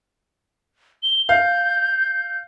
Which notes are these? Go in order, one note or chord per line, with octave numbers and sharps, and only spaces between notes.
G7
F5 G6